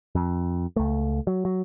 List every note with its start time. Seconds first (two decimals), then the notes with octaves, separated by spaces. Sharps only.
0.15 F2
0.76 C#2 A3
1.27 F#3
1.45 F#3